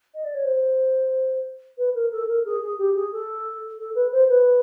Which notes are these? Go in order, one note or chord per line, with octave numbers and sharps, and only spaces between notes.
D#5
D5
C#5
C5
B4
A#4
A4
A#4
G#4
G#4
G4
G#4
A4
A4
B4
C5
B4